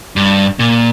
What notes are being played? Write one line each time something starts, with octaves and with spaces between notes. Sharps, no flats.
G2
A#2